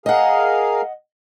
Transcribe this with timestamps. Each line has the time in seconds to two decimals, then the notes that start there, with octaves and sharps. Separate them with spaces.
0.06 G#4 A#4 D#5 F5 F#5